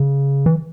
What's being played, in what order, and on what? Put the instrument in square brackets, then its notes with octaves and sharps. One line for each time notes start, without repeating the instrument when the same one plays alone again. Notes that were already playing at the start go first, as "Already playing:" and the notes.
Already playing: [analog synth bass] C#3
E3